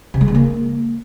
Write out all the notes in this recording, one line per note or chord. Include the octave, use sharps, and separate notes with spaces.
C3
G#3
C#3
A#3